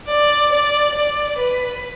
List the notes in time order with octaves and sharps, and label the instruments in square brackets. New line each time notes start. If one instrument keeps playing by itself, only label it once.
[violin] D5
D5
D5
B4